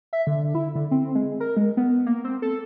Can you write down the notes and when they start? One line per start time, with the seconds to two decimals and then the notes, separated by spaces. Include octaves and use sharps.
0.13 E5
0.27 D3
0.55 E4
0.75 D3
0.91 C4
1.15 G#3
1.40 A#4
1.57 G#3
1.77 B3
2.06 A#3
2.24 C4
2.42 A4